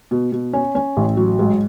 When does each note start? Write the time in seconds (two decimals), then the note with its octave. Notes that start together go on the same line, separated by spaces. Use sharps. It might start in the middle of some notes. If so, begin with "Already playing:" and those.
0.11 B2
0.32 B2
0.53 C#4
0.75 C#4
0.97 A1
1.17 F#3
1.39 G#2